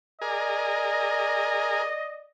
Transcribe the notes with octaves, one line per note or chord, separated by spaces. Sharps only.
G#4 A#4 D5 D#5